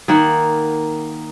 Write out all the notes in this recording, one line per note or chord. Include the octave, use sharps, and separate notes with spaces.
D#3 A#3 F#5